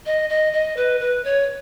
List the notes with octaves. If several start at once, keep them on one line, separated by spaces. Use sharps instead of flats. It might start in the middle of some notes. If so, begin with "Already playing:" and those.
D#5
D#5
D#5
B4
B4
C#5